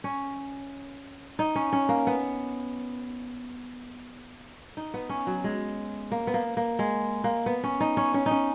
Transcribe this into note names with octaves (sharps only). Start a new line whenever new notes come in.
C#4
D#4
C#4
C#4
A#3
B3
D#4
B3
C#4
F#3
G#3
A#3
B3
A#3
A#3
G#3
A#3
B3
C#4
D#4
C#4
C#4
D#4
C#4